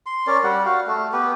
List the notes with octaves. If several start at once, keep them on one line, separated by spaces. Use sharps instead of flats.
C6
C#4 A#4 D5
G3 F#5
F#4 F5
A3
B3 G4 B4